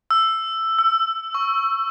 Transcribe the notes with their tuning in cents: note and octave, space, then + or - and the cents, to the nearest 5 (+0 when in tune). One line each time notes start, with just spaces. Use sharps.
E6 +10
E6 +25
C#6 +0